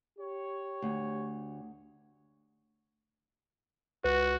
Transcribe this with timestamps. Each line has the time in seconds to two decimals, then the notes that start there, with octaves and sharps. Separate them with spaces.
0.19 G4 C#5
0.82 D2
4.04 C#2 F#4 B4